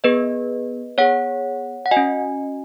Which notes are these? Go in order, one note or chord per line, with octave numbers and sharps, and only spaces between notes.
B3 G#4 B4 D#5
B3 G#4 C#5 F#5
F#5
F#4 D#5 G#5
C#4